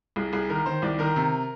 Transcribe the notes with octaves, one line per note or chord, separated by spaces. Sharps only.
C2 G#4
C2 G#4
D#3 A#4
D#3 C5
C2 D5
D#3 A#4
C3